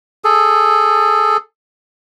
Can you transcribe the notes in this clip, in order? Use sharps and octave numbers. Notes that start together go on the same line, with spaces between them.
G#4 A4